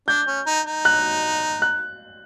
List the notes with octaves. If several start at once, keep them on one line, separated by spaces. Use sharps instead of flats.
D4 G6
C#4
D#4
D#4
F#6
F#6